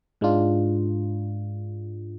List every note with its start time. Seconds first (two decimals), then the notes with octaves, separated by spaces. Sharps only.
0.21 G#2 G#3 D4 F4